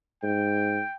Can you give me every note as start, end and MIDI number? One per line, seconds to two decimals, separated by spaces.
0.23 0.80 44
0.23 0.96 79